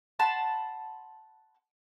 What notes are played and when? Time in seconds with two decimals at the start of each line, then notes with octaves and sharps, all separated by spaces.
0.19 F#5 A5 B5 C6